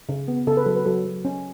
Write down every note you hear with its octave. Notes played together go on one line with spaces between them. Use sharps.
C#3
B3
C#3 A4
B4
F#3 A4
B4
F#3 A4
F#3
C#4